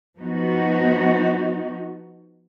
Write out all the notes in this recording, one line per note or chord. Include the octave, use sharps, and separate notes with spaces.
F3 B3 D#4 F#4